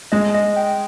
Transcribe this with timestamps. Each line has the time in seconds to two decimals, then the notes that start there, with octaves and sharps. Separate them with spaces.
0.12 G#3 D#5
0.34 D#5
0.56 G5